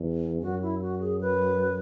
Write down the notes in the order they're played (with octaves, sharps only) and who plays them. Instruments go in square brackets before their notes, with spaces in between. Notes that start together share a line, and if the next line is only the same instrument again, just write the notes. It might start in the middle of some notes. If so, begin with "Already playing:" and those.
Already playing: [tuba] E2
[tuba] F#2 [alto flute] F#4
[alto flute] E4
F#4
G#4
B4